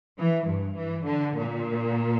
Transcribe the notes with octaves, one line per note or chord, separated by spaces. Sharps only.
E3
G2
E3
D3
A#2